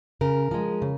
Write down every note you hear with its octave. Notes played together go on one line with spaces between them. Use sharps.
C#3 A#4
F3 G#3
C#3